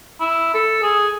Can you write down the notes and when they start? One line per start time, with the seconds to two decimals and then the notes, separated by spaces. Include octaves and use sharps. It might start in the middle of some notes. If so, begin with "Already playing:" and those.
0.20 E4
0.54 A4
0.83 G#4